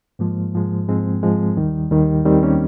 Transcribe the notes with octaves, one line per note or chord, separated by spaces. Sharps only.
G#2 F3 G#3 A#3
G#2 F3 G#3
G#2 F3 G#3 C4
G#2 F3 G#3
D#2 D#3 G3
D#2 D#3 G3
D#2 D#3 G3 C4
A#3 C#4